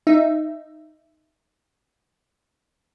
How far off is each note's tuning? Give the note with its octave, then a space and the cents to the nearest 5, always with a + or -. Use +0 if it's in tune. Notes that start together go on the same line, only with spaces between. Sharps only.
D#4 +0 E5 +10